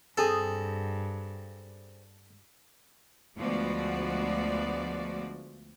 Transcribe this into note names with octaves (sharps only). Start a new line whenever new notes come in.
G2 C4 G#4 A4
D2 F3 G#3 B3 F#4 D5